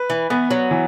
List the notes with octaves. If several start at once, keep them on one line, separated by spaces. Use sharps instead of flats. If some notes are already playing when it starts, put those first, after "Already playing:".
Already playing: B4
E3
E3 B3
F#3
E3